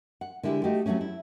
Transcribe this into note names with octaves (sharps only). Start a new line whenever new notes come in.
F#5
D3 G#3 E4 G4 A4
A3 D#4 F#4 G4
F#3 G#3 A3 C4 C#4
E4